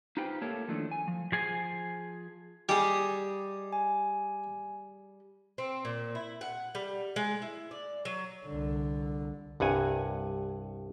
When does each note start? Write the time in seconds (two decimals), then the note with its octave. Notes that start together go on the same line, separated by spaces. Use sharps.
0.17 D#4 F4 G4 B4 C5 G5
0.41 A3 A#3 A4 A#4 C#5
0.68 D#3 F3 A3 D4 E4
0.91 G#5
1.08 F3
1.32 F3 G#4 G#5
2.69 G3 G4 G#4 D#5
3.73 G#5
5.58 C4
5.85 A#2
6.15 E4
6.41 F#5
6.75 G3
7.16 G#3
7.42 E4
7.71 D5
8.05 F#3
8.45 C2 D3
9.60 C2 G2 F#5 G#5